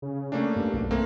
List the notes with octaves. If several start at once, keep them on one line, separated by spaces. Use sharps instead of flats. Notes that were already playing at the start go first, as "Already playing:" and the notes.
C#3
A3 A#3 C#4 D4
G2
B1
A3 A#3 C4